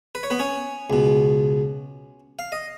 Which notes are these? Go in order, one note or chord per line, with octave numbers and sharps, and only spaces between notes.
B4
C#5
B3 B4
C#4 C#5
C#2 B2
F5
D#5